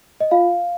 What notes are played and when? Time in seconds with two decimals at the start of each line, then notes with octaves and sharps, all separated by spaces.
0.21 D#5
0.31 F4 F5